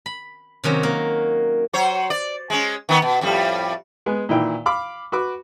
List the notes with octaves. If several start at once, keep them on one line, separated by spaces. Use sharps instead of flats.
B5
C3 D#3 F#3 C#4
A#3
F#3 C5 C#5
D5
G#3 C#4
D#3 B3
B2
F2 A2 G3
G#3 B3 G#5
A#2 D#3 E3 E4 G5
F5 B5 D6
F#4 B4 D6